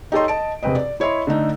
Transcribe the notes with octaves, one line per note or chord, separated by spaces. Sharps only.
D#4 G4 A4 C#5 D#5 C6
D#5 A5 D7
E1 C3 C4 B4 D#5
D5
E4 C#5 D#5 E5 C6
D3 A3 D#4